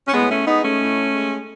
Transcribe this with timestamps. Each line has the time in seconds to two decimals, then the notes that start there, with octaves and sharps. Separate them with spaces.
0.07 C#4
0.14 A2 G#3 B3
0.30 A3 C#4
0.46 G#3 B3 D#4
0.64 A3 C#4
0.80 A2
1.13 G#3